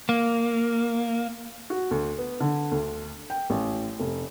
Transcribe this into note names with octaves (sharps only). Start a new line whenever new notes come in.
A#3
F#4
D2
B3
D3
D2
G5
A1
F1